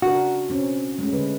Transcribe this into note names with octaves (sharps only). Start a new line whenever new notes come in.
C#3 D4 F#4 A#4
B2 C4 C#4
G#3 A3 C#4
D3 B4